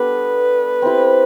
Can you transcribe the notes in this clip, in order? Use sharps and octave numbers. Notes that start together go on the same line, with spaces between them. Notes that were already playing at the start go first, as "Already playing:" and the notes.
Already playing: G3 B3 D4 A4 B4
C4 E4 G4